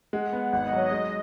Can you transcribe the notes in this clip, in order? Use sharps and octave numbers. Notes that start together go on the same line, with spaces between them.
G#3 F#5
B3
G#1 F#5
D#5
F#3 C#5
G#3 D#5